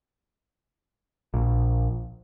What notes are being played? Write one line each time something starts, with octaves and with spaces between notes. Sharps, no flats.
A#1